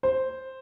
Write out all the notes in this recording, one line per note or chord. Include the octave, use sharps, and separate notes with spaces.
C5